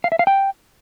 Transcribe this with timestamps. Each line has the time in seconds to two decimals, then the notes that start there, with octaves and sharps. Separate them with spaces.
0.04 F5
0.12 E5
0.19 F5
0.27 G5